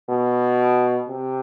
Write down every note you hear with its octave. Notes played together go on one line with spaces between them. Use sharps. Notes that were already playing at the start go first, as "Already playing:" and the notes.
B2
C3